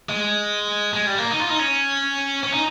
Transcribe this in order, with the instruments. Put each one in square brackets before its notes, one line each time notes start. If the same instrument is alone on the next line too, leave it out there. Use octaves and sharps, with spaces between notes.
[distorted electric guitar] G#3
G#3
G3
A#3
D#4
F4
D#4
C#4
C#4
D#4